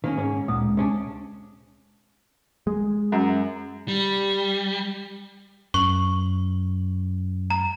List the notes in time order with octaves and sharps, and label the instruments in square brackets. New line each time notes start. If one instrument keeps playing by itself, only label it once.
[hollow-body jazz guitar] D#3 A#3 C#4
G#2 C#4
[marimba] D2 G#3 D#6 [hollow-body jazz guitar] A#2
[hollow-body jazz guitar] C3 C#4 D4
[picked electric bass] G#3
[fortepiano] F#2
[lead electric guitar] G3
[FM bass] F#2 [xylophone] C#6 F#7
[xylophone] A#5